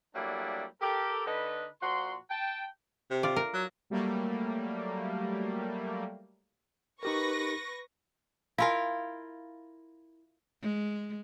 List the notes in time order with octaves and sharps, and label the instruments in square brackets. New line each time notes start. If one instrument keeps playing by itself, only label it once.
[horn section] F#3 G3 A3 A#3 D4 E4
G4 A4 A#4
D3 D#4 A4 B4
A#2 F3 F#4 A#5 C6
G5 A5
[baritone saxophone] C3
[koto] F4 D5
A#4
[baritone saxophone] F#3
[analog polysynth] F#3 G3 A3 A#3
[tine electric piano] D#4 G4 A#4 [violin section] B4 C#6 A#6
[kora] E4 F4 A#4 [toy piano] F5 G#5
[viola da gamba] G#3